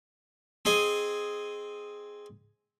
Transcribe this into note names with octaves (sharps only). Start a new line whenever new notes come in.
C4 G#4 D#5 G#5